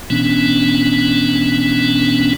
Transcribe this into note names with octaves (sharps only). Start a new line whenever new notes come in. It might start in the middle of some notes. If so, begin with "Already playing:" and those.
B2 E3 B3 C#4 D4